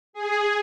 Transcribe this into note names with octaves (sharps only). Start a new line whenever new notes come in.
G#4